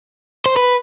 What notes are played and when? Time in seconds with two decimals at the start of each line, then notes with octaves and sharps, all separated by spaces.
0.46 C5
0.56 B4